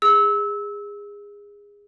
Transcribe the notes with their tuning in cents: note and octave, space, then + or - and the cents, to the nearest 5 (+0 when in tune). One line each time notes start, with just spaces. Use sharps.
G#4 -25 E6 -25